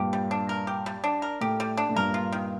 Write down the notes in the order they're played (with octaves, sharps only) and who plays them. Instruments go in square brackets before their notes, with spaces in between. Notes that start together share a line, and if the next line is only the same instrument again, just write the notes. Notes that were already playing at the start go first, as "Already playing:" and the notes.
Already playing: [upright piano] G2 A#2 [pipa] G4
[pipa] G3
D4
A#4
G4
G3
D4
A#4
[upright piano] A2 [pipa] G4
[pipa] G3
D4
[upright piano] A2
[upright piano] G2 A#2 [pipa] A#4
[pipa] F4
D#3